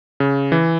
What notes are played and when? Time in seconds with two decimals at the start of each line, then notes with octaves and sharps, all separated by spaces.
0.20 C#3
0.52 E3